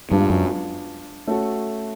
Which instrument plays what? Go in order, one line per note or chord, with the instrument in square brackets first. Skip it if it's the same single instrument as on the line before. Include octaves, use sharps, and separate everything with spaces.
[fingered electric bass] G2 [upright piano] G#3 B3 D4 F4
[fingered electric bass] F#2
[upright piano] A3 C#4 F#4 A4